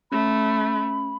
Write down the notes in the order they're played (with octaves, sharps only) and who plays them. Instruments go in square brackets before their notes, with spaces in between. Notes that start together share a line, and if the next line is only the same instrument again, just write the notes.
[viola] A3 [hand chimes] C#4 [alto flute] B5